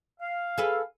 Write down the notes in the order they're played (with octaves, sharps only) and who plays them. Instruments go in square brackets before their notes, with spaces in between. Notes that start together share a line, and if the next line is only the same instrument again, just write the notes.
[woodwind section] F5
[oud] G#4 A4 B4